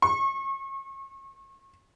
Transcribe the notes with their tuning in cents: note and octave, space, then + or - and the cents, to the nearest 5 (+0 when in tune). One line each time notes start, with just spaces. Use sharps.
C#6 -35